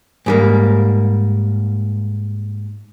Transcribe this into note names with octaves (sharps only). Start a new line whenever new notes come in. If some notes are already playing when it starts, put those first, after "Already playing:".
G#2 G3 A#3